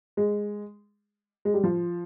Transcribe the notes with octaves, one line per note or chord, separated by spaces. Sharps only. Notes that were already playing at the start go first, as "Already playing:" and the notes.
G#3
G#3
G3
F3